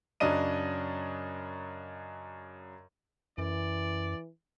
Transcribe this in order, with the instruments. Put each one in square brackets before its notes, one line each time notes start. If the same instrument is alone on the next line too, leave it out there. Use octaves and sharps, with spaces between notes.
[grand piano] F#2 C#3 F#3 D4 D#5 D#7
[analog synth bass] F#2 [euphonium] E3 [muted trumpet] D5